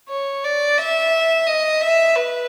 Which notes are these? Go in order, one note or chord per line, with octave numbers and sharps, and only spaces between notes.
C#5
D5
E5
D#5
E5
B4